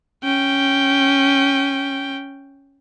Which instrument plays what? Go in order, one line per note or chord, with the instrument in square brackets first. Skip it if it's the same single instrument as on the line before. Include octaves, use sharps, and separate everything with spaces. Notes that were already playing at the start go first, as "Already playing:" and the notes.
[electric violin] C#4 G5